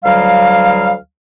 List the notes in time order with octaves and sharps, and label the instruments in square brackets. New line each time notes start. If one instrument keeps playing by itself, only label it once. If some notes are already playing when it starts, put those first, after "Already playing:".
[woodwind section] D2 F#3 G3 F5